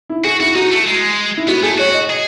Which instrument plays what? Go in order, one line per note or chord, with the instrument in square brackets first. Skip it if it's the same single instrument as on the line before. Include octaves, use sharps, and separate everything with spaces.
[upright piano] E4
[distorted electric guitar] F#4 [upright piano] G#4
[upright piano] E4 [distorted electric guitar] F#4
[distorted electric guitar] D#4 [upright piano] F#4
[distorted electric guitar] A3
G#3
[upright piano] E4
[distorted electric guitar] B3 [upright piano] F#4
[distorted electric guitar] A3 [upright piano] G#4
[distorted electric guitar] F#4 [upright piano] C#5
[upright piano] D#5
[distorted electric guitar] G#4